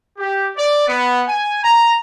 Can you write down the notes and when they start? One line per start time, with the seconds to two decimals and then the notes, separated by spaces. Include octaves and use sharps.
0.18 G4
0.57 D5
0.88 B3
1.28 G#5
1.63 A#5